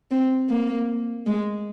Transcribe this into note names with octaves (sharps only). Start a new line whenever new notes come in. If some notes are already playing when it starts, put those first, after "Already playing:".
C4
A#3
G#3